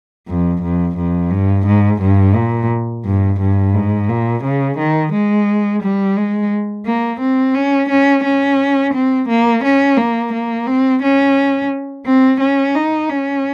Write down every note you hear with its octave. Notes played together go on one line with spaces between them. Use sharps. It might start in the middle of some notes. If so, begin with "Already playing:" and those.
F2
F2
F2
G2
G#2
G2
A#2
G2
G2
G#2
A#2
C#3
D#3
G#3
G3
G#3
A#3
C4
C#4
C#4
C#4
C4
A#3
C#4
A#3
A#3
C4
C#4
C4
C#4
D#4
C#4